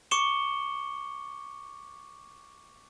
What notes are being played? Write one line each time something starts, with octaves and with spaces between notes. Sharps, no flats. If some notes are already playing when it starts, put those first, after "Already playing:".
C#6 D6 C#7 E7 G7